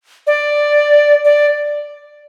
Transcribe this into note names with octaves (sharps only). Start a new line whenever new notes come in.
D5
D5